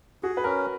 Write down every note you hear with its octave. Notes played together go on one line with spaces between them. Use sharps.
F#4 G#4
B4
C#4 A#4